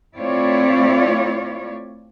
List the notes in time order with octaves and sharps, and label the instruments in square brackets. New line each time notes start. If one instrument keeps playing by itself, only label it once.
[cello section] A3 C4 E4 F4 C#5 D5